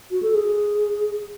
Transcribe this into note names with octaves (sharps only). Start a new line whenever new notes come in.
F#4
A4
G#4